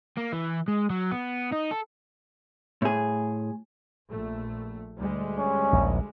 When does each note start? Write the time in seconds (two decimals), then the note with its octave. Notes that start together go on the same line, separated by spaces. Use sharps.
0.17 A#3
0.33 E3
0.68 G#3
0.90 F#3
1.11 B3
1.52 D#4
1.71 A4
2.82 A2 G#4
4.09 A#1 A3
4.97 D2 G3 G#3
5.39 C#4
5.73 A#1 D#2